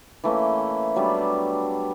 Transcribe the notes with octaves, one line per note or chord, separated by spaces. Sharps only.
E3 A3 A#3 C#4
F#3 G3 B3 D4